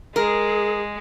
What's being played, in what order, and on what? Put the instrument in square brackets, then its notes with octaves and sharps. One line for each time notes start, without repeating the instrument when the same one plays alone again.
[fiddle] G#3 [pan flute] G#4 [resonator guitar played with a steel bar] A#4